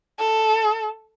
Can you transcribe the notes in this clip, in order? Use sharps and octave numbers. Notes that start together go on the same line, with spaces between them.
A4